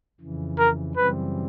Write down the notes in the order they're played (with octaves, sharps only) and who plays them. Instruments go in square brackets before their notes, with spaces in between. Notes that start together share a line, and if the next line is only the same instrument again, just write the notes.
[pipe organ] F2 C#3 E3
[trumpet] A#4
[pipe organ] F#2 C#3 E3 G3 C4 [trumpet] B4